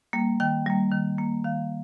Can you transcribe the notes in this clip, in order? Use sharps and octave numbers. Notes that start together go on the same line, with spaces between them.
G3 A#3
D#3 G5
G3 A#3
D#3
A#3
D#3 F5